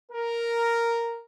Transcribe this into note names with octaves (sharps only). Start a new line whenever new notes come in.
A#4